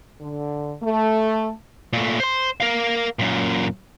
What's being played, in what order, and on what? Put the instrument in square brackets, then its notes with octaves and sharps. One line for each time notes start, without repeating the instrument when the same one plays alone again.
[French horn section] D3
A3
[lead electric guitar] A#2 A3
C5 C6
A#4 F5
F#2 A#2